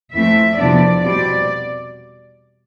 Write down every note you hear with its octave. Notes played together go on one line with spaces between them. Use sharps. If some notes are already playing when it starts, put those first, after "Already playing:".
F2 E3 A3 C4 E5
E2 C3 F3 B3 D4 D5
B2 G3 C4 D5